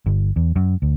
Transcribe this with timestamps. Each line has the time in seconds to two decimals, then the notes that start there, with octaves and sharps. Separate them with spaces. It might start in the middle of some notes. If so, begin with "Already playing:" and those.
0.06 G1
0.36 E2
0.56 F#2
0.82 D2